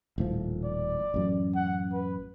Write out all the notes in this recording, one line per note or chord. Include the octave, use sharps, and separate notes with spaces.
D#1 A2 F3
D5
A1 F#2
F#5
B4